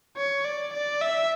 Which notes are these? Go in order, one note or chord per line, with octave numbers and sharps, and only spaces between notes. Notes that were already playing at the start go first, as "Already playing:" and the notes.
C#5
D5
D5
E5